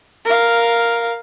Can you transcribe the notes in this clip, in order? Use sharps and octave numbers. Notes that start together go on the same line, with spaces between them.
A#4 F5